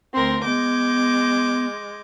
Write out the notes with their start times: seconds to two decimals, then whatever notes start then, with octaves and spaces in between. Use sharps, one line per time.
0.13 D2 C4 A#4 C6
0.45 G#3 B3 D6 G6 G#6